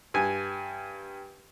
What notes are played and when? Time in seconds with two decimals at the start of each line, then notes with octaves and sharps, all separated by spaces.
0.14 G2 G#5